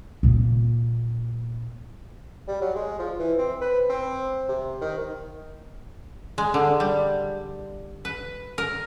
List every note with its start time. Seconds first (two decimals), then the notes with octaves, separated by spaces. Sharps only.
0.23 A#2 A#3
2.48 G3
2.61 F#3
2.76 G#3
2.99 F3
3.19 E3
3.38 C4
3.61 B4
3.90 C4
4.49 C3
4.81 D#3
6.38 G#3
6.54 D3
6.80 G3
8.05 B4
8.58 A#4